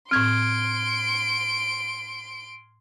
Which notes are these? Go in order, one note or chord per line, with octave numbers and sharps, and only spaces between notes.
A2 C4 C6 F6 G#6 D7